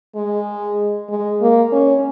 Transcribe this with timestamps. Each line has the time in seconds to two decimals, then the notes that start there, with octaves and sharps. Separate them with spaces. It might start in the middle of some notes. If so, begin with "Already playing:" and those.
0.16 G#3
1.09 G#3
1.41 A#3
1.72 C#4